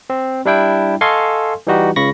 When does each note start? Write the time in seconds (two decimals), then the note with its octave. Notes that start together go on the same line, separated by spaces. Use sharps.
0.10 C4
0.45 G3 D4 E4 G5
1.01 A4 D#5 F5 G#5 C6 C#6
1.67 E3 G3 D#4 F#4 G4
1.96 C#2 C#3 B5 C#6 A#6